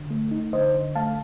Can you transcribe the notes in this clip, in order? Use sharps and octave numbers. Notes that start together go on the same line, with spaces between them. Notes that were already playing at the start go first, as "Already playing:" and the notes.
Already playing: D3
A3
D#4
D3 C5 D#5
D3
A3 F5 A5